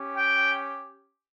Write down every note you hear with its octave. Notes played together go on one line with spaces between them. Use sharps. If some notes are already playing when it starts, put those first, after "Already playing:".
Already playing: C#4 G4
G5